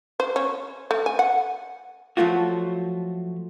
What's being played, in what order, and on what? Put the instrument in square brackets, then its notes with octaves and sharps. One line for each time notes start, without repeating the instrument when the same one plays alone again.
[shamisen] C5
C#4
A3
G#5
F#5
[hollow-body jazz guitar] F3 F#3 A3 F4 F#4